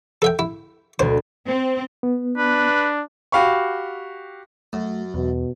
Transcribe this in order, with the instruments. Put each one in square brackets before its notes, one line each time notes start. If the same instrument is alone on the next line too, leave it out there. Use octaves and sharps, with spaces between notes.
[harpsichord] A4 E5 G5
E4
[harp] D2 B2 [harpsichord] C5
[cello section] C4
[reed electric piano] B3
[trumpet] D4 [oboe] B4
[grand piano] F#4 G4 F5 B5 C#6
[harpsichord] F#2 [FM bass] A3
[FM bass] E2 [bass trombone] B2